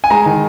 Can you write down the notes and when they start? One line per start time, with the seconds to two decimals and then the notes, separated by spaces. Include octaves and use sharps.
0.04 G#5
0.10 G#3 A#5
0.26 D#3